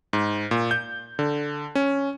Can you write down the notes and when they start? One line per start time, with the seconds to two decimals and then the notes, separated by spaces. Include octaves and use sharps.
0.13 G#2
0.51 A#2
0.71 G6
1.19 D3
1.75 C#4